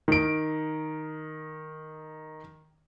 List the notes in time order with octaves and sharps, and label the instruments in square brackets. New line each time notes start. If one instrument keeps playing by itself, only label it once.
[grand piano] D#3 D7